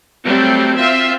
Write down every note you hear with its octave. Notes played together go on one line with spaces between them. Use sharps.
F#3 G3 A3 C4
C4 F4 E5